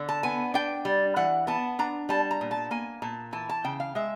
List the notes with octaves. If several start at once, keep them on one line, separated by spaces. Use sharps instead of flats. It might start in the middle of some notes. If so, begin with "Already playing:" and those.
Already playing: D3
A5
B3 G#5
D4 G5
G3
E3 F#5
B3 A5
D4 A#5
G3 A5
A#5
A#2
A5
A#3 G#5
A#2 A5
E3 A5
A5
C#3 G5
F5
G#3 E5